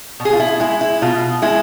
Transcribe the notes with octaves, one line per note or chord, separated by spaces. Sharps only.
B2
G#4
F4
E4
G#3 E4
E4
B2 F4
G#3 E4